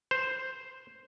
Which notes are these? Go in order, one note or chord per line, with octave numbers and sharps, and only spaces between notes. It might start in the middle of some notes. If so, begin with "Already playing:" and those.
C5